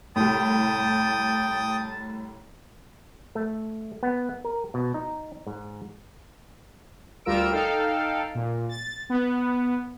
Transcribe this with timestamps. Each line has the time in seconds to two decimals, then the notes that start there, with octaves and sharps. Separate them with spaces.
0.16 C2 A2 G5 A5 D#6
3.35 A3
4.03 B3
4.45 A#4
4.74 B2
4.94 D#4
5.47 G#2
7.25 D2 G3 F4 A#4 E6 D7
7.51 D#4 A4 F5 G5
8.35 A#2
8.69 A6
9.10 B3